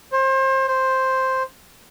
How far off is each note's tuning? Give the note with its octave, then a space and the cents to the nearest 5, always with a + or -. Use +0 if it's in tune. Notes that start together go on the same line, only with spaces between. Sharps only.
C5 +30
C5 +5